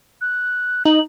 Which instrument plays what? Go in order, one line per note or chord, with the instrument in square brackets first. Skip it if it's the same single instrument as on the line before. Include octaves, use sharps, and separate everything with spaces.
[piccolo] F#6
[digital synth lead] D#4 [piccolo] F#7